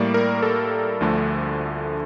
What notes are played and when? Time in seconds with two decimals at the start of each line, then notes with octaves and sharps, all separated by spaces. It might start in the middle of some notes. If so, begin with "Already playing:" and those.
Already playing: A2 G3 A#3 D5
0.14 A#4
0.42 A4
1.01 D2 D3 F3 A3 D4